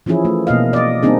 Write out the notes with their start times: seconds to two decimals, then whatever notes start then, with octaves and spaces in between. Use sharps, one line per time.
0.06 E3 F3 C#4 E4 G#4
0.25 A3
0.47 B2 A#3 D#5 F5
0.73 D5 D#5
1.03 G3 A#3 C4 D4 D#4 G#4